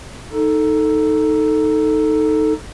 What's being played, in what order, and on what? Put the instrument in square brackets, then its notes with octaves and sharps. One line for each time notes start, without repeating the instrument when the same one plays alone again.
[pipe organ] D#4 A4